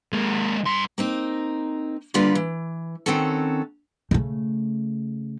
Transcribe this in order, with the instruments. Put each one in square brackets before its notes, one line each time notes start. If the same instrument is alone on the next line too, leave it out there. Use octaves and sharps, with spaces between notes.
[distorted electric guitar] G#3 A#3
G2 C6
[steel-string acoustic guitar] A#3 C4 D#4
D3 G3 A#3 F4 B4 D5
E3
D#3 F#3 C4 C#4 F#4 A4
[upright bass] C#3 A3